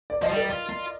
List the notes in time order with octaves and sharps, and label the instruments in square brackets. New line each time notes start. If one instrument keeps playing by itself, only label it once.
[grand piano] D5
[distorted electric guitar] F3 [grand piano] D#5
[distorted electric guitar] G3
[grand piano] A#4 D5
[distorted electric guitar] F4
F4